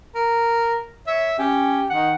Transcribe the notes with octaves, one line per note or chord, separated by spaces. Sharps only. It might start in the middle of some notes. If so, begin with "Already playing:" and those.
A#4
C#5 E5
C#4 G4
D#3 F#5